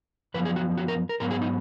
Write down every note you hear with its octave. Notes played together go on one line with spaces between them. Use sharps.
F#2 F3 B3 B4
G#4
F#4
F#4
A#4
A#4
G#2 F#3 B3 A#4
G#4
D#4